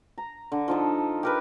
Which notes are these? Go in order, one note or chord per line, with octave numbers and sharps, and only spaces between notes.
A#5
D3
F3 D#4 A4
G4 A#4 B4